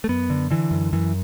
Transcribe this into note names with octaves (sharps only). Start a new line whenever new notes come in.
A3
F#2 B3
D3
D3 E3
F#2
F#2 E3